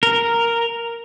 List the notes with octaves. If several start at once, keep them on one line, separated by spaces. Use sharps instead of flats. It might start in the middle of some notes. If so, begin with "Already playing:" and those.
A#4